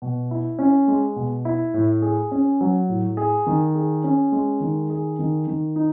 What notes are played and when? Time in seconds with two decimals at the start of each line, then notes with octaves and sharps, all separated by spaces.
0.02 B2
0.31 E4
0.59 C#4
0.88 G#3
1.16 B2
1.45 E4
1.74 A2
2.02 G#4
2.31 C#4
2.61 F#3
2.89 A2
3.17 G#4
3.46 D#3
3.75 G#4
4.04 C#4
4.32 G#3
4.60 D#3
4.90 G#4
5.19 D#3
5.47 D#3
5.76 D#4